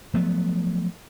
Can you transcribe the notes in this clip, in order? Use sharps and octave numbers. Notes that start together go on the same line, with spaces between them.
F3 F#3 A3 B3